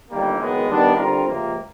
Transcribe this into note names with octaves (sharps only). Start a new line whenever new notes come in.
G1 G2 D#3 G3 A#3
F#1 F#2 D#3 G#3 B3
D#3 G3 B3 D4
D3 G3 C4 F4 A#4
C#2 C3 F3 A#3